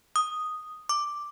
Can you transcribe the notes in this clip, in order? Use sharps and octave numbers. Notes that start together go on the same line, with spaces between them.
D#6
D6